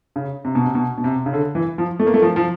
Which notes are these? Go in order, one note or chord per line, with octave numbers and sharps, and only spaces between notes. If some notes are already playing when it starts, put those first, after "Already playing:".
C#3
C3
B2
C3
B2
B2
C3
C#3
D3
E3
F3
A3
A#3
A3
F3
F3